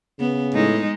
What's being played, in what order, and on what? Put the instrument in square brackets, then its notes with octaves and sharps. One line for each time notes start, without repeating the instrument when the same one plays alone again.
[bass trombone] C#3 [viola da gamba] B3
[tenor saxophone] A2 [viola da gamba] G#3 [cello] D#4